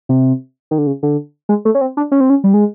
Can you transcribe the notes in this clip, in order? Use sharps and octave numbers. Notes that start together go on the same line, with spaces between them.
C3
D#3
D3
C#3
D3
G#3
A3
C#4
C4
D4
C#4
C4
C#4
G3
G#3